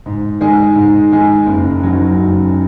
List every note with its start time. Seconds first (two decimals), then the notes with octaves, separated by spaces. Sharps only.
0.06 G#2
0.41 D#3 G#3 D#4 G#4
0.76 G#2
1.11 D#3 G#3 D#4 G#4
1.46 F#1
1.82 F#2 F#3 D#4
2.17 F#1